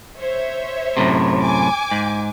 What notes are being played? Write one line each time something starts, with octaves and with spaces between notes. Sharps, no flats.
C5 C#5 E5
F#2 A2 C3
G#5 D6
G#2